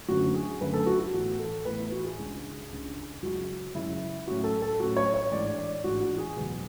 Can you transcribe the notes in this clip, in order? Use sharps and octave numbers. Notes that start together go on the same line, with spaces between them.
F#1 F#2 D3 A3 C#4 F#4
G#4
F#1 F#2 D3 A3 C#4 B4
A4
F#4
F#4
A1 A2 E3 B3 F#4
A4
A1 A2 E3 B3 B4
E4
F#4
G#4
C#2 C#3 G#3 D4
C#2 C#3 G#3 D4
F#2 C#3 G#3 F#4
F#2 C#3 G#3 E4
A2 F#3 C#4 E4 F#4
A4
A4
A2 F#3 C#4 E4 F#4
C#5
C#5
A1 G#2 G#3 D4 D5
D5
A1 G#2 G#3 D4 F#4
F#4
G#4
F#1 E2 B2